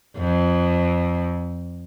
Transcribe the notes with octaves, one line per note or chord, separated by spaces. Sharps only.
F2